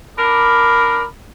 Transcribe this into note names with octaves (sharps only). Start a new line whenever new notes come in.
D4 A#4 B5 D6